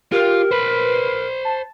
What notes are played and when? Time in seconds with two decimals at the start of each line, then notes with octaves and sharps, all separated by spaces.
0.12 F4 G4 A#4
0.51 B4 C5 B5
1.45 A5